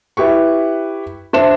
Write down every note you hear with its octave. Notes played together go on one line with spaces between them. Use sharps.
E4 G4 B4 C#6
D4 C5 E5 E7